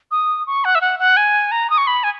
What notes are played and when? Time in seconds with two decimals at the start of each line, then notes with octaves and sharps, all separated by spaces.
0.11 D#6
0.47 C#6
0.65 F#5
0.75 E5
0.81 F#5
0.99 F#5
1.17 G#5
1.52 A#5
1.70 D#6
1.78 C#6
1.87 B5
2.04 G#5